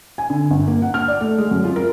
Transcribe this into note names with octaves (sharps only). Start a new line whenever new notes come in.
G#5
D3
G1
A#3
F#5
F6
D5
A3
G#3
F#2
F4
A#4